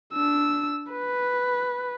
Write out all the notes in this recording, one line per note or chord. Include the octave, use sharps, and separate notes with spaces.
D4 E6
B4